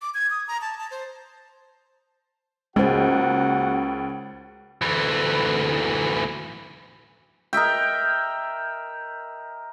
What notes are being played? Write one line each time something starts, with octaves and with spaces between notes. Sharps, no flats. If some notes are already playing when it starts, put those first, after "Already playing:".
D6
G#6
D#6
A#5
A5
A5
C5
C#2 G#3 A#3 F#4 C5 F#5
D2 E3
A#4 D#5 E5 G5